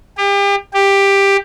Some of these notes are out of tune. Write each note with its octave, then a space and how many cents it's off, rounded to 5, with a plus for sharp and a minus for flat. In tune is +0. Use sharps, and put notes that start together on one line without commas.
G4 +35
G4 +10